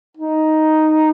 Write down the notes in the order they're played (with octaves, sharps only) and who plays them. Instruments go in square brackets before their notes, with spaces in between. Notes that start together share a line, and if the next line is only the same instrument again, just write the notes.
[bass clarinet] D#4